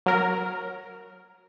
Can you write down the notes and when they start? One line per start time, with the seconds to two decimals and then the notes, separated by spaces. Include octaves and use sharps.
0.06 F#3 A#4